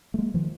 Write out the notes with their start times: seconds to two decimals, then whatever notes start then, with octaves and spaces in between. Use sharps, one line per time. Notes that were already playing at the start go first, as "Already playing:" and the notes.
0.14 A3
0.18 G#3 A#3
0.34 D#3 F3